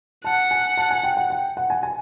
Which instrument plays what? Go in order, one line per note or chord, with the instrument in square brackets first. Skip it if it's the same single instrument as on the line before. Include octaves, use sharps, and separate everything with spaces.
[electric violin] F#5 [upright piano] A5
[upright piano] G#5
A5
G#5
G5
F#5
G5
F#5
G#5
G#5